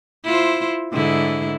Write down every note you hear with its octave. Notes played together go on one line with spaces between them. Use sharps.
E4 F4 C5
G#2 D3 E4